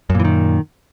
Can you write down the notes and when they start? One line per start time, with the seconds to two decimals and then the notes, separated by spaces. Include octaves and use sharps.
0.10 F#2
0.15 A#2
0.20 E3
0.25 D#3